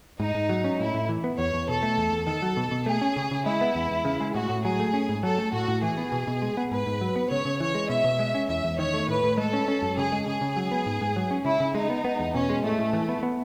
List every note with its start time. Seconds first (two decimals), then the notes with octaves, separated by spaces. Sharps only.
0.20 G#2 D#4
0.35 G#2
0.49 F#3
0.64 C#4
0.79 A2 E4
0.94 A2
1.09 E3
1.24 B3
1.38 E2 C#5
1.54 E2
1.68 B2 A4
1.83 A3
1.98 E2
2.12 E2
2.27 D#3 A4
2.42 F#3
2.57 B2
2.71 B2
2.86 A3 G#4
3.01 C#4
3.16 C#3
3.31 C#3
3.46 G#3 E4
3.61 B3
3.75 E2
3.90 E2
4.05 C#3
4.20 G#3
4.35 A2 F#4
4.49 A2
4.65 F#3 G#4
4.79 A3
4.94 C#4
5.09 G#2
5.23 F#3 A4
5.38 A3
5.53 A2 F#4
5.68 A2
5.82 E3 G#4
5.97 B3
6.12 B2
6.27 B2
6.42 G#3
6.57 B3
6.71 G#2 B4
6.87 G#2
7.01 F#3
7.16 B3
7.31 C#3 C#5
7.45 C#3
7.60 E3 C#5
7.75 G#3
7.89 B2 E5
8.04 B2
8.19 G#3
8.34 C#4
8.49 E2 E5
8.64 E2
8.78 D#3 C#5
8.94 A3
9.08 A2 B4
9.23 A2
9.37 G#3 A4
9.53 C#4
9.68 C#4
9.82 F#2
9.97 C#3 G#4
10.12 G#3
10.26 C#3 G#4
10.41 C#3
10.56 F#3
10.71 B3
10.86 G#2
11.01 G#2
11.16 F#3
11.31 C#4
11.45 C#3 E4
11.60 C#3
11.75 G#3 D#4
11.90 B3
12.04 B3
12.19 E2
12.34 B2 C#4
12.49 G#3
12.63 A2 A3
12.79 A2
12.93 E3
13.09 B3
13.23 B3